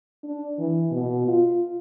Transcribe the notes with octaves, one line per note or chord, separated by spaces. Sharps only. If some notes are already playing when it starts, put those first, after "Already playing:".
D4
E3
B2
F4